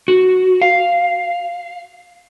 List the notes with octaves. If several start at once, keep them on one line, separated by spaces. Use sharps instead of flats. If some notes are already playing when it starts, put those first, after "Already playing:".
F#4
F5